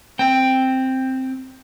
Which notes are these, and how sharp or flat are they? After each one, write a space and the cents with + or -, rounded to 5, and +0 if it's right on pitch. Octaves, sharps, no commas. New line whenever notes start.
C4 +0 G5 +5